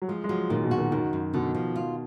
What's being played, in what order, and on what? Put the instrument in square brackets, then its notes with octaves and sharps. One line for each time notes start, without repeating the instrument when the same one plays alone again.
[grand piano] F#3
[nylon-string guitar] F3 [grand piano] G#3
[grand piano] G#3
[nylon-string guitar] F3 [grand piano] F#3
[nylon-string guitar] A#2 [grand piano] D#3
[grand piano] B2
[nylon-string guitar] F#4
[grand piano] D#3
[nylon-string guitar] F#2 [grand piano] D#3
[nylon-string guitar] F#2
[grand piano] B2 [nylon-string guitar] D3
[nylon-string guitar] F3
F4